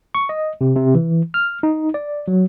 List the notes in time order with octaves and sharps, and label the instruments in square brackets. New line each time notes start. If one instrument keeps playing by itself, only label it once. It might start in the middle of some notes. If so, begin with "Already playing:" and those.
[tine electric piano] C#6
D#5
C3
C3
E3
F6
D#4
D5
F#3